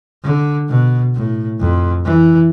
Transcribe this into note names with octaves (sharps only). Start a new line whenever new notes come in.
D3
B2
A2
F2
E3